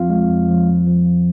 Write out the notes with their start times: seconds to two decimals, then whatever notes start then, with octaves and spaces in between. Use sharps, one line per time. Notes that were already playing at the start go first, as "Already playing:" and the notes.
Already playing: F2 F3 C4 F4 F5
0.10 G#3
0.30 F2
0.49 F3
0.68 F2
0.87 F3
1.07 F2